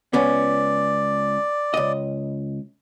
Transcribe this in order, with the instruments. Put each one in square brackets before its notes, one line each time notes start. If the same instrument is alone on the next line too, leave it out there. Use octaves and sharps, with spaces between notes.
[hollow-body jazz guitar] C#2 B3 C#4 [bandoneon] D5
[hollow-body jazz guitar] C#2 D#5